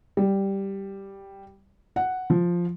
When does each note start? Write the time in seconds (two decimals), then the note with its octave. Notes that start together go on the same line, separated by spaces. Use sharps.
0.17 G3
1.96 F#5
2.30 F3